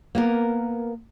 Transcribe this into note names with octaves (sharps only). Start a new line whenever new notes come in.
A#3 B3 A#4